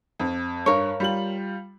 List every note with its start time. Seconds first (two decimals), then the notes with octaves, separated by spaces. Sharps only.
0.20 F2
0.66 G2 A#4 C#5
1.00 G3 F4 F#7